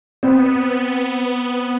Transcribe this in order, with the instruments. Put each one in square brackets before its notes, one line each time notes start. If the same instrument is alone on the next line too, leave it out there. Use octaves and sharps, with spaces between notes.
[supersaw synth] B3 [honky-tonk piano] C4